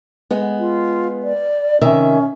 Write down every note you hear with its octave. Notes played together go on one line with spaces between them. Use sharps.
G#3 B3
F4
D5
C3 D#3 C#4 E5